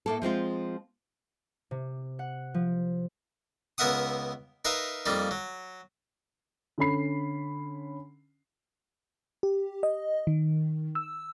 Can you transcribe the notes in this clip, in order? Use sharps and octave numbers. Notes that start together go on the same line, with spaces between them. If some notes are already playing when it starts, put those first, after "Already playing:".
A2 A#3 A4
F3 G#3 C4 F4
C3
F#5
F3
C#2 B3 A#4 E5 F#5 D#6
D#4 A#4 B4 E5 F5
F2 G3 A#3 D#4
F#3
D3 C#4 B5 C7
G4
D#5
D#3
E6